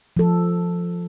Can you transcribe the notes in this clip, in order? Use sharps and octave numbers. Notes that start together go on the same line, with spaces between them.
F3 A4